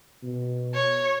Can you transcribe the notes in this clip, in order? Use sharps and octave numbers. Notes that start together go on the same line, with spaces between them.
B2
C#5